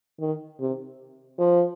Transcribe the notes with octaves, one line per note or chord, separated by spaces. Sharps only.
D#3
C3
F3